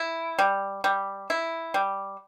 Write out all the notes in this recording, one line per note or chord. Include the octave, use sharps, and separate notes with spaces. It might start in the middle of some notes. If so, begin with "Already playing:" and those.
Already playing: E4
G3
G3
E4
G3